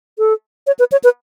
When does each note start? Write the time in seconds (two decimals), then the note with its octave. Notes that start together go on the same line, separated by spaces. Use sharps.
0.18 A4
0.67 C#5
0.79 B4
0.92 C#5
1.04 B4